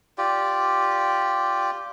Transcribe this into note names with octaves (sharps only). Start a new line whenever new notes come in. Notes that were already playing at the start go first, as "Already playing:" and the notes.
F4 G4 D5